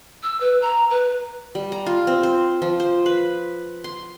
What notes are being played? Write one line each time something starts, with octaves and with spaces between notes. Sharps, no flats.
E6
B4
A#5
B4
G3
A#5
F4
C4
C5
F3
C5
B4
C6